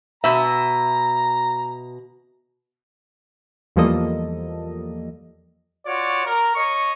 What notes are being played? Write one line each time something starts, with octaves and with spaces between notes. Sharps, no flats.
B2 E5 A#5
E2 F3 G3 A#3 A4 D#5
F4 F#4 C#5 D5
A#4
C#5 D#5 C#6